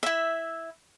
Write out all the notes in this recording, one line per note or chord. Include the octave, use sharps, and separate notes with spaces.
E4 E5